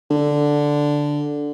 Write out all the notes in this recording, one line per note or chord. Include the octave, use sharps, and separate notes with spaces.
D3